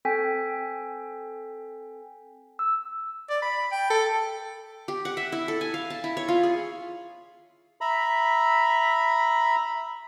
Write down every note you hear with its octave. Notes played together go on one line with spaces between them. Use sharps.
C4 A4 G5 G#5 B6
E6
D5
B5
G5
A4
G4
F#5
E5
E4
A4
G#5
F5
A5
E4
C#5
F4
G#4
E5 A#5 B5